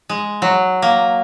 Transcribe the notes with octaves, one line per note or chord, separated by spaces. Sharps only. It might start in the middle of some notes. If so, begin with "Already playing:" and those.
G#3
F#3
A#3